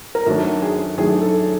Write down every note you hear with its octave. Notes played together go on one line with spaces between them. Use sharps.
A#4
F#2 D#3 F#3 A3 D4 A4
G#4
F#2 D#3 F#3 A3 D4 G#4
A4